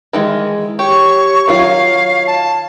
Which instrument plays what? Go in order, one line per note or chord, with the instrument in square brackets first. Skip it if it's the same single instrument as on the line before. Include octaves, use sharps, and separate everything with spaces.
[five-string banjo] D#3 E3 G#3
[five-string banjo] G4 [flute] C#5 [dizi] C#6
[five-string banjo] D#3 F#3 F4 [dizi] F5
[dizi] A5